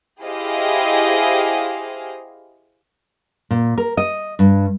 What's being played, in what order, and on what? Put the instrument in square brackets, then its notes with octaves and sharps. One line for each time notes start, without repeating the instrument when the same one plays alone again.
[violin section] E4 G4 G#4 C5 D#5 F5
[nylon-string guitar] A#2
A#4
D#5
G2